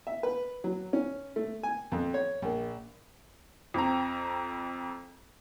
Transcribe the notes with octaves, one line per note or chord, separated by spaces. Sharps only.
E5
B4
F#3
C#4
A3
G#5
F2
C#5
A#1
F2 C4 A#5